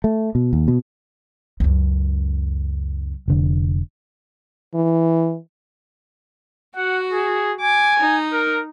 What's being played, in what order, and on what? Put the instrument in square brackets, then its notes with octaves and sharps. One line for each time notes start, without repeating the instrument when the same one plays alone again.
[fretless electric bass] A3
B2
D#2
B2
[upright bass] C#2 F#2
[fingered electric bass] F1 D3
[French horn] E3
[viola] F#4 [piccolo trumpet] F#5
[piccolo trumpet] G#4
[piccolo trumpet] G#5 [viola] D6
[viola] D#4
[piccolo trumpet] A#4